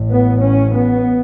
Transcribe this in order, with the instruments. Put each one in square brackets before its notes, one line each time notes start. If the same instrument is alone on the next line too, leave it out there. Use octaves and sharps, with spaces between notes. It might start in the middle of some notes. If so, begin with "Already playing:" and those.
Already playing: [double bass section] A1 A2
B3
C#4
B3